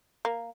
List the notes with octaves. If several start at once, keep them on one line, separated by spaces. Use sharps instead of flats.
A#3